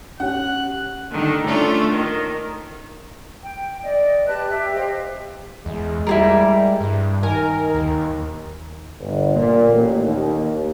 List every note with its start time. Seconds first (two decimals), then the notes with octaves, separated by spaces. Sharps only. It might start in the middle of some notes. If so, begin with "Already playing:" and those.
0.20 C#4 G4 C#5 F#5 F#6
1.10 D3 D#3
1.45 A3 C#4 D4 F4
1.90 D#3
3.43 G5
3.83 D5 D#5
4.28 G4 B4 A5 F#6
4.50 G4 E5
4.74 G4 C5 D#5 F5
5.66 E2 G#3
6.07 G3 E4 G#4 A#4
6.81 G2
7.23 D#3 A#4 G#5
7.75 D#2
9.00 G1
9.34 A#2
9.70 A1
10.01 D#2